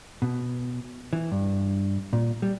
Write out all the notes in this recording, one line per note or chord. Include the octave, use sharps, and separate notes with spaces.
B2
E3
G2
A#2
G3